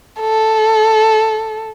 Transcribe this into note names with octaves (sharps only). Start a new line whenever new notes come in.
A4